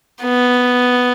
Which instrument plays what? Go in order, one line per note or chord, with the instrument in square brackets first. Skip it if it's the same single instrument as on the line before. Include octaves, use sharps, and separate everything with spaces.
[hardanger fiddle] B3